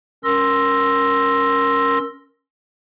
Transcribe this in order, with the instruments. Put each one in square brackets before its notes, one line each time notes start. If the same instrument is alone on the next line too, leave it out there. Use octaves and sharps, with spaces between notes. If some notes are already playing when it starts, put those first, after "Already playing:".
[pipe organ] C#4 A#4 C6 E6 A#6